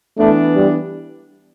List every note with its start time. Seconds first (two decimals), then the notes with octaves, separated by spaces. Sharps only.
0.18 E3 A3 B3 D4
0.56 G3